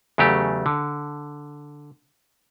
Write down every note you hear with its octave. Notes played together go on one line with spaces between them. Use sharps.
E2 C#3 F#3 A3 G4
D3